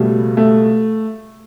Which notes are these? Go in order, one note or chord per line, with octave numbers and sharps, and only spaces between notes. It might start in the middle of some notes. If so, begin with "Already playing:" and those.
Already playing: C#2 B2 G3 A3
A3